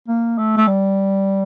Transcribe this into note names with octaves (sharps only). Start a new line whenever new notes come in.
A#3
A3
A3
G3